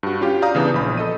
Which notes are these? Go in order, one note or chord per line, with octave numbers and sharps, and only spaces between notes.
G2 F#4
C#4 F4 G4
D5 F5 A#5 D#6 G6
C#3 E3 B3 D4
A#1 B5
A4 D#5 D#7